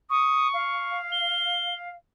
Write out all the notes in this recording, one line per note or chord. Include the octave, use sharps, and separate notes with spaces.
C#6 D#6
F5
G7